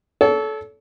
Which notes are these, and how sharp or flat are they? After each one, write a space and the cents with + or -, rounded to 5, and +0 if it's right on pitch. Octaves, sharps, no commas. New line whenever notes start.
A4 -20 C#5 +40